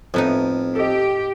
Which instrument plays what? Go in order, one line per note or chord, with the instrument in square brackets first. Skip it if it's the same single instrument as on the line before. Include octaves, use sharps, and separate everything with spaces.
[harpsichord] F2 [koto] A2 B3 D#4
[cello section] G4 [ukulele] A4 D#5